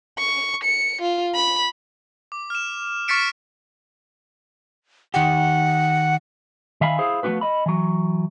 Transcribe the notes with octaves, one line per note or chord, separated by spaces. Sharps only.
C#6
C#7
F4
B5
D6
F6 E7
C#6 F6 A6 B6 C#7 D7
D#3 G4 F#5
D#3 E5 F5 G#5 B5
E4 G#4 C5 F5
F3 A3 B3 D4 F#4 B4
D#5 B5
E3 F#3